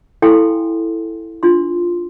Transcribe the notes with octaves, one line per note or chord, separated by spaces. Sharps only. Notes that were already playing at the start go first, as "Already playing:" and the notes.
E4 A4 F5 G5 G#5 C6
D4 F4 C6